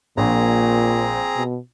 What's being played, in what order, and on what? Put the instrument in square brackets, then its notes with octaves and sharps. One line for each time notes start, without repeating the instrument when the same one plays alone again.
[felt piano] A#1 [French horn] A#2 [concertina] C4 G#4 A#5
[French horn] B2